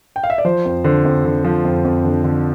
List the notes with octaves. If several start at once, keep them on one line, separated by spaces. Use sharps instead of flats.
G5
F5
E5
D5
F3 C5
F2
D3 C5
F2
D3
F3
F2
F2
D3
D3